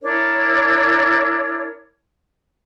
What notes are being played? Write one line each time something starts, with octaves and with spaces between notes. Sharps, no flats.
D4 E4 A#4 C#5